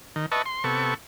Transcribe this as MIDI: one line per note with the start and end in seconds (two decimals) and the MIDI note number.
0.16 0.26 51
0.32 0.42 71
0.32 0.42 75
0.32 0.42 76
0.32 0.42 81
0.32 0.42 85
0.46 0.64 84
0.64 0.94 48
0.64 0.94 59
0.64 0.94 69
0.64 0.94 85